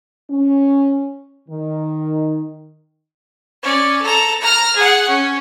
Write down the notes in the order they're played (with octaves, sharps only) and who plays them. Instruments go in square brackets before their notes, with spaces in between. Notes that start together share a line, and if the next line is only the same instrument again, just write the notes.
[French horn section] C#4
D#3
[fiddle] C#4 D5
A4 A#5
A#5 F6
G#4 F#5
C#4